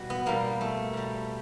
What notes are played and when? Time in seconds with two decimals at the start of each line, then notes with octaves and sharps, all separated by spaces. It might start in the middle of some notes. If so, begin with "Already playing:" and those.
Already playing: B2 G3 F#4
0.10 B3
0.26 B2 G3 A#3
0.61 A3
0.93 B2 G3